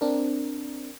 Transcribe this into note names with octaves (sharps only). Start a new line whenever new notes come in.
C4 D4 A#4